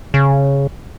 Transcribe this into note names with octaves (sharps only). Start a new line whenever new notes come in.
C#3